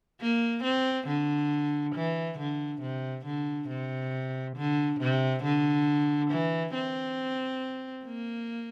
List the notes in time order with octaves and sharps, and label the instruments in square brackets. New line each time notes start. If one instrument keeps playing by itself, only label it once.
[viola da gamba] A#3
C4
D3
E3
D3
C3
D3
C3
D3
C3
D3
E3
C4
A#3